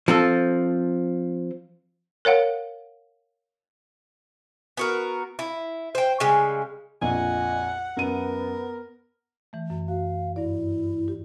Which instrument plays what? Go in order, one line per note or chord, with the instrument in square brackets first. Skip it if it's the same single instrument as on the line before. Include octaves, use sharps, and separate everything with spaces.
[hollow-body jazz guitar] F3 C4 A4
[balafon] A#4 C#5 F5 F#5
[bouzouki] B3 F#4 A#4
E4
C5 G5
C#3 G3 G#3
[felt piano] A#1 F2 [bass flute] D#5 [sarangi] F#5 [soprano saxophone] G#5
[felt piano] F#2 D#7 [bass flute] B3 [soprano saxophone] A#4
[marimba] E3 A3
F#2
[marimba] F#4 [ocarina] F5
[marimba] G2 D5 [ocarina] E4
[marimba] G4